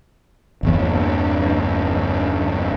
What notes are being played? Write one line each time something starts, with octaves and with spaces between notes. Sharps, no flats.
G1 E2